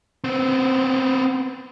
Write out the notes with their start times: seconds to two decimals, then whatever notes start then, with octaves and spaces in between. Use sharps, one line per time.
0.24 B3 C4